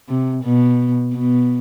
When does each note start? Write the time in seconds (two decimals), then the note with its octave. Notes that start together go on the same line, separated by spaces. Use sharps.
0.09 C3
0.43 B2
1.13 B2